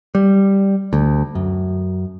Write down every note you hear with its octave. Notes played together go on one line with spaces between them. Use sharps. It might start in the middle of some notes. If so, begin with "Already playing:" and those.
G3
D2
F#2